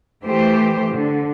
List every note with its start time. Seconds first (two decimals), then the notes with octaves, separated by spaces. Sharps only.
0.24 E3 A3 G4 C5
0.91 D3